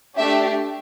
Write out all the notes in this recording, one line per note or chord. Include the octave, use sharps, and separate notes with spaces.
A3 D4 G4 E5